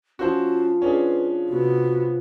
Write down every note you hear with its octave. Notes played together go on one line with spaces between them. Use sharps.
F3 C#4 F4 F#4 C5 E6
C#4 D4 G#4 B4
C3 B3 F#4